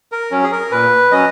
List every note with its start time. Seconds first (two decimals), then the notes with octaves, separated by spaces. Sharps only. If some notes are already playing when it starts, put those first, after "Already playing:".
0.12 A#4
0.31 F#3 C#4
0.43 G#4
0.52 A#4
0.72 A#2 B4
1.11 F#3 C#4 D#5